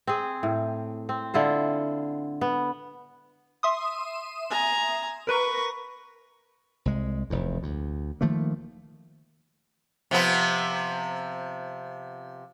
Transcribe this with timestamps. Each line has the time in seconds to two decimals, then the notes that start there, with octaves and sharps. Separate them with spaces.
0.07 C4 G#4
0.43 A2
1.09 C4
1.34 D3 E4 F4 C5
2.41 B3
3.63 E5 C6 D#6
4.50 G#5 A#5
5.27 A#4 B4 A#5 B5 C#6
6.85 C2 G#3
7.30 F1 E2
7.63 D2
8.21 D#3 F3 A3 A#3
10.11 C3 F3 B3